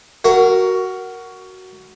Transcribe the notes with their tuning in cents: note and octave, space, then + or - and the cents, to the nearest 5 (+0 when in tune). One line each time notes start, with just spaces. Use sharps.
F#4 +10 A#4 +0 F5 -40